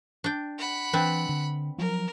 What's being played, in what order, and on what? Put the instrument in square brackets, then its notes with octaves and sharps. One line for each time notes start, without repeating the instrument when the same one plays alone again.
[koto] D4 G5
[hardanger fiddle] F#5 B5
[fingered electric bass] E3 [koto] C4 D4 B4
[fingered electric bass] D3
[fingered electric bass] F3 F#3 [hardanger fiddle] A#4